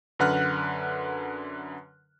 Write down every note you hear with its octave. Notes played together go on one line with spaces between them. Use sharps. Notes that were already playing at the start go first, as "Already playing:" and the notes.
F#2 D3 B4 F#5 F6 F#6